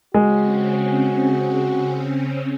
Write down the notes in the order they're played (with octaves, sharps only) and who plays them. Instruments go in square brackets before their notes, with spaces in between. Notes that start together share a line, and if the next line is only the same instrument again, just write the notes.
[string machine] C#3 C4 C#4 [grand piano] G#3 [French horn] F#4